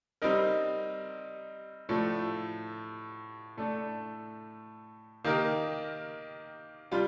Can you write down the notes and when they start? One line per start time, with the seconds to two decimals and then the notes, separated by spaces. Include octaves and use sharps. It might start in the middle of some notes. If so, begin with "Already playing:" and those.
0.22 G3 C4 D#4 A#4
1.89 A2 F3 A3 D4 A4
3.57 A2 A3 D4 A4
5.24 D#3 A#3 D#4 G4 A#4
6.91 G3 D4 F4